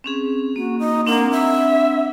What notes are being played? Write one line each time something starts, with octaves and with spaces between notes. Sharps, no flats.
C4 C#4 G#4
A#3 F#4
D#4
A#3 C4 D4 F#5
E5